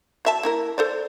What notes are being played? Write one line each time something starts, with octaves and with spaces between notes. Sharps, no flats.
F#3 E5 A5
A#3 E4 A#4
A4 C5 D5